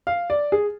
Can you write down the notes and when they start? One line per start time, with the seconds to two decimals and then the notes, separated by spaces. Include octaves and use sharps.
0.07 F5
0.30 D5
0.52 G#4